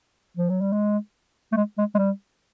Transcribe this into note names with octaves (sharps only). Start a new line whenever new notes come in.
F3
F#3
G3
G#3
A3
G#3
G#3
G#3
G3